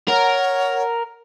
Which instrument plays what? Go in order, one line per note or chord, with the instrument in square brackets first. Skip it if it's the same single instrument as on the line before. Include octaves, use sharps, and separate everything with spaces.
[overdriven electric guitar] A#4 [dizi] C#5 [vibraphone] F#5